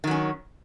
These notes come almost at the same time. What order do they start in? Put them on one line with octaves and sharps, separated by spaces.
D#3 F#3 C#4